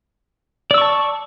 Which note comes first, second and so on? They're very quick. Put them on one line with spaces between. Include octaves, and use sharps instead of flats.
D5 E6 C#6 A5